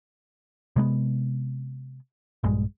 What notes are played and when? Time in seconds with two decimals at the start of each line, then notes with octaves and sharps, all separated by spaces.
0.76 C3 G#3 A#3 B3
2.44 A#1 G2 G#3